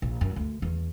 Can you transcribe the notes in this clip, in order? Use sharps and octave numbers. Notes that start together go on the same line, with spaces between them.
A#1
F#2
D2
E2